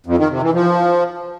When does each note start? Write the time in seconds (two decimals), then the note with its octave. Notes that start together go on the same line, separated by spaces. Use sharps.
0.06 F2
0.18 D#3
0.30 C3
0.42 E3
0.54 F3